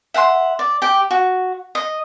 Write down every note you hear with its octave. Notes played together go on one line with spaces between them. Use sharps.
E5 F#5 G5 C6
D5
G4 G5
F#4
D#5